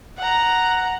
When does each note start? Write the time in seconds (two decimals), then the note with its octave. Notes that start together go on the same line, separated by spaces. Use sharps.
0.18 F#5 A#5